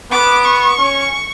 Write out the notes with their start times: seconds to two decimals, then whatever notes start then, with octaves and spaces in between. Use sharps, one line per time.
0.11 B3 D6
0.45 C#6
0.79 C#4